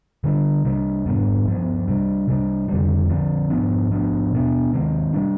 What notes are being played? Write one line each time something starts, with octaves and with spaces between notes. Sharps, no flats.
D3 G3 D4
C3 G3 D4
G#2 G3 B3 D4
G2 F3 B3
C3 G3 D4
C3 G3 D4
F2 D3 G3
D3 F3 C4
G#2 F3 B3 D4
G#2 F3 B3 D4
B2 B3 D4
C3 D#3 G#3 C4
C3 G3 D4